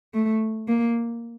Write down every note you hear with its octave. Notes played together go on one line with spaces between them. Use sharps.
A3
A#3